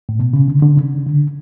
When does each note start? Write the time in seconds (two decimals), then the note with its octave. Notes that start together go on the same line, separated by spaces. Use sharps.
0.09 A2
0.20 B2
0.33 C#3
0.48 D3
0.62 D3
0.78 C#3
1.07 D3